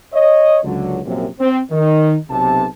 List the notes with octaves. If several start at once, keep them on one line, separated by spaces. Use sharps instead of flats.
C#5 D#5
C#2 D3 F#3
A#1 F#2 C3
C4
D#3 D#4
B1 C3 A5